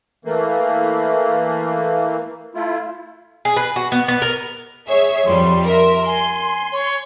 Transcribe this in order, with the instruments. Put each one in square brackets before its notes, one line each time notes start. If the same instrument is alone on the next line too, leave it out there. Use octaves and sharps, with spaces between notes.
[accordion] E3 A3 A#3
A3 E4 F4
[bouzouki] G#4
B4
F#4
B3
B3
A#4
[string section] G#4 C#5 E5
[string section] F2 G3 [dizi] C6
[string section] A#4 E5
[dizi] G#5 [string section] C6
[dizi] C#5